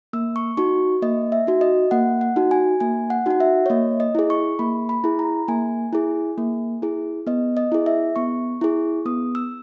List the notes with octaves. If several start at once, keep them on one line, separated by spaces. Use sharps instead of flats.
A#3 E6
C#6
D#4 F#4 C#6
A#3 D#5
E5
D#4 F#4
D#5
A#3 F#5
F#5
D#4 F#4
G#5
A#3 G#5
F#5
D#4 F#4 F#5
E5
C#5
A#3 D#5
D#5
E4 G#4
C#6
A#3 B5
B5
E4 G#4
A#5
A#3 G#5
E4 G#4
A#3
E4 G#4
B3 D#5
D#5
E4 G#4
E5
B3 C#6
E4 G#4
B3 D#6
E6